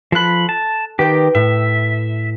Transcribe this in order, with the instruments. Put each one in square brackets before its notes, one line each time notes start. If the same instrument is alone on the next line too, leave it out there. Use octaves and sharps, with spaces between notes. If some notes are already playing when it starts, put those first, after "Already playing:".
[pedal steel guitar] F3 B5 [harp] A4 F#6
[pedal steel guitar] A5
[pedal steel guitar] D#3 G4 [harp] B4 G5
[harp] A2 [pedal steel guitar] E5